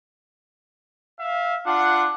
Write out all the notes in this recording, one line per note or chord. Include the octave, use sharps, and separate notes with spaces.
E5 F5
D4 F4 F#5